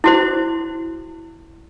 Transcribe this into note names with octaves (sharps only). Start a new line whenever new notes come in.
E4 F#4 C5